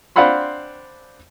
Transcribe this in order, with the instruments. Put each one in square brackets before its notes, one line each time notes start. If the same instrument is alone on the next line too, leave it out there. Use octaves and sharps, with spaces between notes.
[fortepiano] C4 D4 F5 F#5 B5 C6